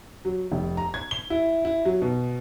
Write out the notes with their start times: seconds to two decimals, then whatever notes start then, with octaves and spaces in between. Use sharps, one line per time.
0.25 F#3
0.51 F1
0.77 A#5
0.94 G#6
1.11 G7
1.30 E4
1.65 E4
1.85 F#3
2.02 B2